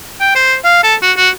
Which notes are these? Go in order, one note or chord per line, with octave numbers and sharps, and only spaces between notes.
G5
C5
F5
A4
F#4
F#4